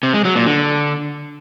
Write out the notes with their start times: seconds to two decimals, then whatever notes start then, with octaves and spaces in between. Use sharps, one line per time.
0.03 C3
0.14 G#3
0.25 F#3
0.36 A#2
0.46 D3